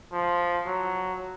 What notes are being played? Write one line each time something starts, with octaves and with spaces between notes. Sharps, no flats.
F3
F#3